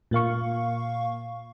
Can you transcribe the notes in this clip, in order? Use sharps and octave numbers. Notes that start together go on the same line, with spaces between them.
A#2 A#3 F5 C#6